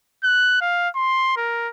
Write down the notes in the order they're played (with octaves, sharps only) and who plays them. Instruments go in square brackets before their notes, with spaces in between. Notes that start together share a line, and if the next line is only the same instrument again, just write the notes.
[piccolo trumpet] F#6
F5
C6
A#4